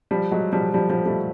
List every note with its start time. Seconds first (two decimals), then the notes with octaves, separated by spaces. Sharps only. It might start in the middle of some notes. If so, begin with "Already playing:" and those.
0.11 F3 G3
0.32 F#3 G#3
0.53 F3 G3
0.74 F3 G3
0.90 F3 G3
1.06 G3 A3